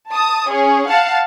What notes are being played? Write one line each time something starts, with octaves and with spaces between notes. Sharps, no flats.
A5 D#6
C#4 G#4
F5 F#5 A5